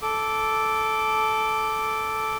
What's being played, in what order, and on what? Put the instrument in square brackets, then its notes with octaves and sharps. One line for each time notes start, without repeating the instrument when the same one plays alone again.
[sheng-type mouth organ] A4 D6